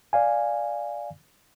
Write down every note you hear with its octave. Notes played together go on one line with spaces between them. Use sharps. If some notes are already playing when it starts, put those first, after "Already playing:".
D5 F5 G#5